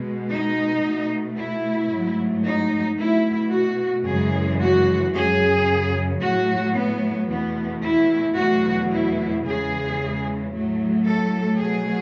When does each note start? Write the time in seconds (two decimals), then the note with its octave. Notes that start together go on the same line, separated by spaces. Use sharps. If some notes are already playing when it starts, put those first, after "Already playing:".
Already playing: B2 G#3
0.30 D#4
0.83 B2 A3
1.38 E4
1.91 G#2 F#3 A3
2.45 D#4
2.98 B2 A3 E4
3.52 F#4
4.06 F#2 C#3 E3 G#3 G#4
4.60 F#4
5.14 F#2 C#3 F#3 G#4
6.21 A2 F#3 A3 F#4
6.75 B3
7.30 E2 B2 A3 B3
7.83 E4
8.37 E2 B2 F#3 A3 F#4
8.91 E4
9.45 E2 C#3 E3 G#3 G#4
10.53 A2 F#3 A3
11.07 A4
11.60 B2 F#3 A3 G#4